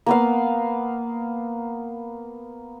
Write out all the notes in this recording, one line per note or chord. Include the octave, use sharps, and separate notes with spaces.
A#3 B3 F5